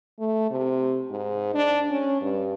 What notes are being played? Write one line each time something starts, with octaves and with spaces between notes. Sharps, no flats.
A3
C3
G#2
D4
C#4
G2